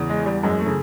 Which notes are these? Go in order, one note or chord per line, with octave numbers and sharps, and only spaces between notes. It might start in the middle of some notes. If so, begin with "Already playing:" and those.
Already playing: E2 C#3
G#3
E3
G3
F#2 G#3
A3
C#3